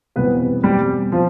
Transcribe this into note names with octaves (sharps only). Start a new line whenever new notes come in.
E2 B2 G3 B3 C4 B4
G3 G4
F3 F4